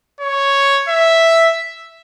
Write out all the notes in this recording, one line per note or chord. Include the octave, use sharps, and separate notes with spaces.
C#5
E5